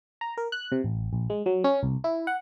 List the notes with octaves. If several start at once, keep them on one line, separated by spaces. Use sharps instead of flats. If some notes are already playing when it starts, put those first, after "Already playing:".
A#5
A#4
F#6
C3
A1
A#1
G#3
F#3
C#4
C2
E4
F#5